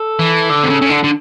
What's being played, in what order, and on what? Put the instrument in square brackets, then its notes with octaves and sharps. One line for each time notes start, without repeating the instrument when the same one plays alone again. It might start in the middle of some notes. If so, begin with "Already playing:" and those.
Already playing: [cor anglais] A4
[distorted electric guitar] E3
D3
C3
C#3
C#3
D3
D3